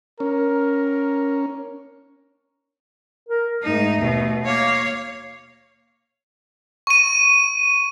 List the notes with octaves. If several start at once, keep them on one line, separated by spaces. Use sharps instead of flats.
C#4 A#4
A#4
G#2 A3 D#4
D#2 B2
A#3 C#5 F5
C#6 D#7